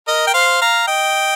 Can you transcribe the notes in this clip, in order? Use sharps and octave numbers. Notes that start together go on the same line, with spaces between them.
A#4 D#5
G5
C5 F5
F5 A#5
D#5 G5